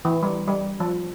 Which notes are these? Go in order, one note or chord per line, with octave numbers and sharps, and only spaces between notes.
E3
G3
G3
F3